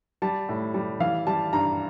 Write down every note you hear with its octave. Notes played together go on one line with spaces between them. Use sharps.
G3 A5
A2
G3
E3 F5
G3 A5
G2 A#5